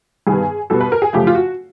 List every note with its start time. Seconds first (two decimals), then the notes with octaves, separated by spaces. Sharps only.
0.27 G2 D#3 G3 B3 G#4
0.70 B2 G3 B3 A4
0.80 B4
0.92 A#4
1.02 G#4
1.13 F#2 C#3 F3 A3 G4
1.27 F4
1.35 F#4